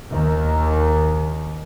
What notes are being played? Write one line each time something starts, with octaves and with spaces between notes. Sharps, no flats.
D#2 D#3